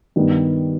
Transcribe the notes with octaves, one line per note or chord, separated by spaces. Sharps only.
G2 D#3 G3 B3